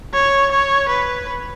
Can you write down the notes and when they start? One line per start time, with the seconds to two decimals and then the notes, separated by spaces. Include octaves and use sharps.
0.14 C#5
0.52 C#5
0.89 B4